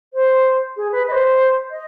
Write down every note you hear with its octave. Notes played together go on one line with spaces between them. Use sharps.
C5
G#4
B4
D#5
C5
D#5